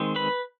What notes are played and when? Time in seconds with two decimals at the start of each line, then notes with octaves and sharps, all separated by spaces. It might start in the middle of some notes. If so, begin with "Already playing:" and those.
Already playing: D#3 G#3 C4
0.16 B4 B5